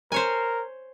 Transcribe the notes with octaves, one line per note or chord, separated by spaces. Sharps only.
A#4 C5 C#5 G#5